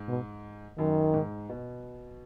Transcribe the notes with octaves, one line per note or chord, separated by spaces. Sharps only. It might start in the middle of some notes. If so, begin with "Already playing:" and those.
Already playing: G#2
B2
F#2 D#3
G#2
B2